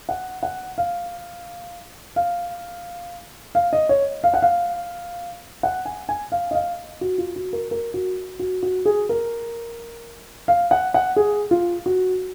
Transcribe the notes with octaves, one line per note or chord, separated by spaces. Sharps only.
F#5
F#5
F5
F5
F5
D#5
C#5
F5
F#5
F5
F#5
G#5
G#5
F5
D#5
F5
F#4
F4
F#4
A#4
A#4
F#4
F#4
F#4
G#4
A#4
F5
F#5
F#5
G#4
F4
F#4